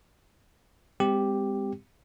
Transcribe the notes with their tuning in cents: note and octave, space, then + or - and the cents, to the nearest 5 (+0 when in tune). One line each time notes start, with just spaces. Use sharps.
G#3 -35 C4 -25 G4 +0